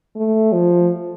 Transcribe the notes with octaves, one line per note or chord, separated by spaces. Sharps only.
A3
F3